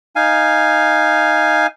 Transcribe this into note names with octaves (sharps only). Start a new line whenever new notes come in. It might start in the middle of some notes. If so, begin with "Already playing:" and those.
D#4 F5 G#5